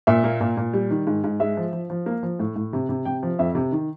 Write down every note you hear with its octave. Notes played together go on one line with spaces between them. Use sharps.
A#2 E5
A#3
A#2
A#2
G3
D#3
G#2
G#2
G#3 E5
F3
F3
F3
A#3
F3
A2
A2
C3
C3
C3 G5
F3
F2 E5
C3
D#3